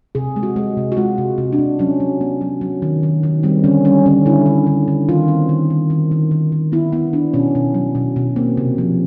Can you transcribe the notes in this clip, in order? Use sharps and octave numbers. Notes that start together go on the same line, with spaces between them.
C3 G#4
G#3
F#4
G#3
C3
F#4
G#3 F4
C3
C3
D4
C3
F#3 C#4
F#3
B3
F#3
F#3
D#3
D#3
D#3
G3 C4
D3 C#4
G3 C#4
D3 C#4
D3 E4
D3
D3
D3
D#3 F4
C4
D#3
D#3
D#3
D#3
D#3
D#3
B3 E4
B3 E4
B3 D4
B2 C#4
B2
F#3
B2
B2
A#3 C4
C3
F3